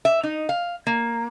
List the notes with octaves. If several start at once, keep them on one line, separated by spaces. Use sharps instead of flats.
E5
D#4
F5
A#3